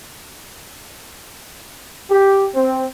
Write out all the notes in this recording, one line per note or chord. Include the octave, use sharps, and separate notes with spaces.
G4
C4